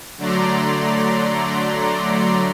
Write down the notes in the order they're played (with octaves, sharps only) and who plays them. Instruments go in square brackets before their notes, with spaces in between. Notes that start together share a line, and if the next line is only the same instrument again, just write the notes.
[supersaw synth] D3 F#3 A3 D5 A#5 C6